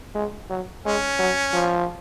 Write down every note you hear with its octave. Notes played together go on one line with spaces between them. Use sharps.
G#3
F#3
G#3 C#4
F#3
F3